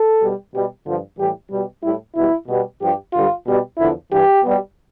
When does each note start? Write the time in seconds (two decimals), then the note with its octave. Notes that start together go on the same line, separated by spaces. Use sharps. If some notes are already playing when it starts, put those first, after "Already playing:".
Already playing: A4
0.20 B2 G3
0.53 B2 G3
0.86 G2 D3 F3
1.18 A2 E3 G3 G4
1.50 B2 G3
1.83 A2 G3 E4
2.16 B2 G3 E4
2.48 B2 G3
2.80 G2 F3 G4
3.13 G2 D3 G3 F4
3.46 B2 G3
3.78 E2 D3 F3 E4
4.11 G2 E3 G3 G4
4.44 B2 G3